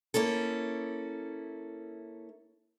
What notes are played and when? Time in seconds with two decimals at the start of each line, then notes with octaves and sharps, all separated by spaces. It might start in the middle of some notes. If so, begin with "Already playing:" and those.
0.14 A#3 C#4 E4 A4